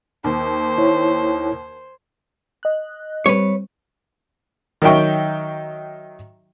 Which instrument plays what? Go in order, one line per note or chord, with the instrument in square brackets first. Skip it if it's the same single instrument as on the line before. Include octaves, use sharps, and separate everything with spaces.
[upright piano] D#2 [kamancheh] C5
[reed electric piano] E4 C#5
[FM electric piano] D#5 F#6
[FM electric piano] G3 C4 [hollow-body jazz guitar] B4 C#5
[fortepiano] D#3 F#3 D#4 E5 G5 C#6